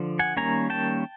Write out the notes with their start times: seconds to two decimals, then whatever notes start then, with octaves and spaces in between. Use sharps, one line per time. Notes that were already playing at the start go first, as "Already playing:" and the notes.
Already playing: D3 F3
0.19 F#5 G#5
0.37 D#3 G3 A#3 C#4 G#5 A#5
0.70 G5 A5